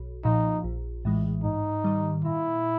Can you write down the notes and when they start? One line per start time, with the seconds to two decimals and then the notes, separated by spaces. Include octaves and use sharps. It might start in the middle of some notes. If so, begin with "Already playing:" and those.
Already playing: B1
0.25 A#2 F3 D#4
0.64 A#1
1.05 A2 E3 G#3
1.44 G#2 D#4
1.84 D#3 G3
2.25 A#2 E4